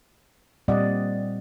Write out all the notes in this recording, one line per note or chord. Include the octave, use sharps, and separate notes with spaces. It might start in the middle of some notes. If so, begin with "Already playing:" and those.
A#2 G3 C4 D5 D#5 F#5